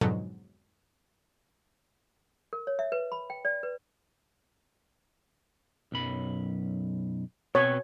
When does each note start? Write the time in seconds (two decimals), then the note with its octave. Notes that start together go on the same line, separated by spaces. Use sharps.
0.01 F2 G#2 B2 D3 F#3
2.53 A#4
2.67 C#5
2.79 E5
2.92 B4
3.12 B5
3.30 G5
3.45 D5
3.63 B4
5.92 B1 F#2 B5
7.55 B2 C4 B4 C#5